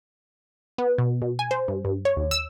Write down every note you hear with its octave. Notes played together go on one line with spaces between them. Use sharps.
B3
B2
B2
G#5
C5
G2
G2
C#5
D#2
E6